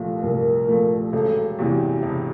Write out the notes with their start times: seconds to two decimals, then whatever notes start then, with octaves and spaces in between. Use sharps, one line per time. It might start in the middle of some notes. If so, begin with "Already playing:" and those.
Already playing: C2 A#2 F3 A3
0.23 C2 A#4
0.68 A#2 F3 A3
1.13 E1 A4
1.58 E2 C3 E3 F#4
2.03 E1